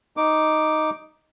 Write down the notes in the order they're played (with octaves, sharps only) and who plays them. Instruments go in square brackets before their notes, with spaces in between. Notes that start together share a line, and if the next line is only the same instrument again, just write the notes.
[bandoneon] D#4 D6